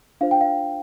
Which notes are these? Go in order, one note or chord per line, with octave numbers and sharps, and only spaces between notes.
D4 F4 C5 F5
G5
F5